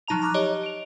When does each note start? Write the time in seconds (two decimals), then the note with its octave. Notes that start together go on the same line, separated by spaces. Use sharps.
0.08 F3 F#3 D#4 A5 A#5 F7
0.22 A#5 C#6 D6 F6 F#6
0.34 G4 C#5 D#5
0.63 D7 F7